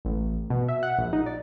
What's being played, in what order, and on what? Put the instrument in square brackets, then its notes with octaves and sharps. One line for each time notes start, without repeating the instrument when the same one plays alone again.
[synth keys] A1
B2
E5
F#5
A#1
D#4
D5